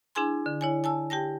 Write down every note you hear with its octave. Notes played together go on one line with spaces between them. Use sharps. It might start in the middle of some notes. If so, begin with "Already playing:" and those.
D4 E4 G#4 G#5 C6
D3
E4 C#5 G#5
G#5 A5 E6
G4 G5 A5 A#6